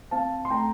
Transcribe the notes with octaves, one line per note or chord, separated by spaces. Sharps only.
C4 F5 A5
C6
A3 G5 A#5